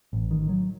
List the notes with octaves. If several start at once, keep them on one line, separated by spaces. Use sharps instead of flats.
A1
D#3
F#3